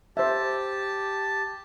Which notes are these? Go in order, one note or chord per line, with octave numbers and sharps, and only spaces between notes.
G4 C5 E5 A5